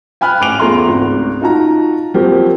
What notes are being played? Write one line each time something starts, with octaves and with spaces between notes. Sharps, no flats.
G5 G#5 B5 F6 F#6
A1 D6 D7 F7
E2 A3 F4 A#5 C6
G#1 C#2
D#4 F4 F#4 A5 A#5
F3 F#3 A#3 C4 G4